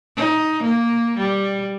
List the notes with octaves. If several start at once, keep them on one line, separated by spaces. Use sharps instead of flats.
D#4
A#3
G3